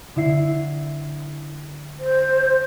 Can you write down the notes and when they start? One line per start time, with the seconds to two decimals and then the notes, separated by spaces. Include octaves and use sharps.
0.16 D3 E4 C7
1.99 C5